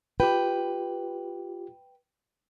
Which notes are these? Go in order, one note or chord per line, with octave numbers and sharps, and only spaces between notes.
F4 G4 B4 G5